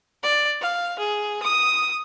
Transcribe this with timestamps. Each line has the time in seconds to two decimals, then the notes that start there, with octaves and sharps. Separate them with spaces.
0.23 D5
0.61 F5
0.99 G#4
1.43 D#6